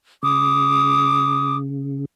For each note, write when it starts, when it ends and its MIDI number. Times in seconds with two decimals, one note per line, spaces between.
0.23 2.05 49
0.23 1.56 86
0.23 1.56 87